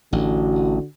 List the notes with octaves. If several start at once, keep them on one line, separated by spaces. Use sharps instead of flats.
A1 D3 F#4